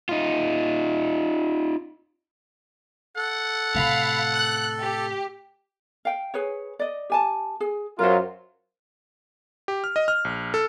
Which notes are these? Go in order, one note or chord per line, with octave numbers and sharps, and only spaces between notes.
D#4 F4
A4 F#5
A2 C3 F5 B5
F#6
G4
F5 G5
G#4 B4 C#5
D5 D#5
G4 G#5 A5
G#4
F#2 F#3 F4 A#4 C5
G4
F6
D#5
F6
A#1
A4